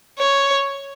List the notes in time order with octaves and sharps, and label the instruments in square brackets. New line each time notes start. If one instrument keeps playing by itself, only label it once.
[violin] C#5